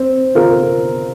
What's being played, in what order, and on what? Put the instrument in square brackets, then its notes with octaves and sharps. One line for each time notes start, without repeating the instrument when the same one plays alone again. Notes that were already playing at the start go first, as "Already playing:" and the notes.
Already playing: [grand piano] C4
F4 A#4